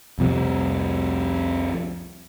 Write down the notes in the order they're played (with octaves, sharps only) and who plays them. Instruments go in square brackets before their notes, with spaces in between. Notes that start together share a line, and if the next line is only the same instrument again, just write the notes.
[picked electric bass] C2 F2 C3